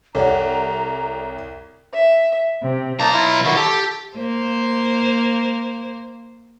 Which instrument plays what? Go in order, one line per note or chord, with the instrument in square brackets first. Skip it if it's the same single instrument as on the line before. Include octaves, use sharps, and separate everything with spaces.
[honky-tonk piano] C2 G4 [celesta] A4 [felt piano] C#5 D5 F#5 [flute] A#5
[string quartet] E5
C3
[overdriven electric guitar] B1 A#5 [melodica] A#3 D#4 A5
[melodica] E4 F4
[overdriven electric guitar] D3 D#3 [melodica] E4 F#4
[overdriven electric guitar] G4 [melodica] A4
[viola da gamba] A#3 C5